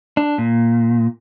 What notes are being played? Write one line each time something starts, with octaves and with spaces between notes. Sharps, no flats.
D4
A#2